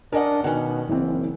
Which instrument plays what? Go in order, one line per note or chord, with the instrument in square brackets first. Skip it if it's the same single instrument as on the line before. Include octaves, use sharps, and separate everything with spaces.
[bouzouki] C#4 D#5 F#5 [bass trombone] D4 [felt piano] A#4
[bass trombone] B2 [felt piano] D#3 [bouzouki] C#4 F#5
[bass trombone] F#1 [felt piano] E3 C4